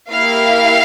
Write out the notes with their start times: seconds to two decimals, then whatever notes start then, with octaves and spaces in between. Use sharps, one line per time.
0.11 A#3 E4 G4 F5